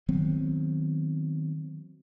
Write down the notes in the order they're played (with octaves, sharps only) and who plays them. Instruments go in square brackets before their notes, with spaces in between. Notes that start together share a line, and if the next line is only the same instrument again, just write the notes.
[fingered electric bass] D#3 F#3 B3 C4